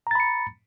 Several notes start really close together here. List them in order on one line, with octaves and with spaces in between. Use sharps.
A#5 A6 B5 C#7